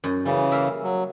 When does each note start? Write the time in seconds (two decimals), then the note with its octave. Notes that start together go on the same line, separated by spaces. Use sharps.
0.04 F#2 D#4
0.26 C#3 E3 G3
0.52 A#3 A#4 E5
0.83 F#3